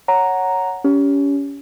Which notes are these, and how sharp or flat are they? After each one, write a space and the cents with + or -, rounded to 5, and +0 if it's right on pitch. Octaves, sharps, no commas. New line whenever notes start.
C#5 +0 F#5 +0 A#5 +0
C#4 +25 G4 +0